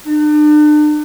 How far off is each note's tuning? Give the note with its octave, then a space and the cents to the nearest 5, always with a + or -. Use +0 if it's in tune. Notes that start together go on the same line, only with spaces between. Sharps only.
D4 +40